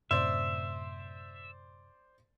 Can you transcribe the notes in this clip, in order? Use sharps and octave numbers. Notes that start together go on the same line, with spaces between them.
F#2 A2 C3 C5 D5 E5 C6